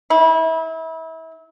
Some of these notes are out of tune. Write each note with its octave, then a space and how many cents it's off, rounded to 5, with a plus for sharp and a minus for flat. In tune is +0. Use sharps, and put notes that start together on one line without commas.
E4 -30